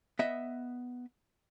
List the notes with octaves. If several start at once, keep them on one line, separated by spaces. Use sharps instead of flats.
B3 D#5 E5